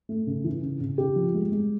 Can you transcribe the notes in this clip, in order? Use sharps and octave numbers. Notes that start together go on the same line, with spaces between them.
A3
C#3
E3
C#3
C#3
C#3 G4
F3
G#3
G#3